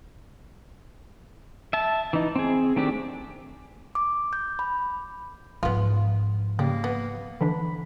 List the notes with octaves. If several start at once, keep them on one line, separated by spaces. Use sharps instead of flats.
E5 A5
E3 D#4
C4 G#4
D#3 A3 C4 D4 G4
D6
G6
B5
G#2 F3 B3 F4
C#3 G3 A#3
B3
D3 E3 D4 B5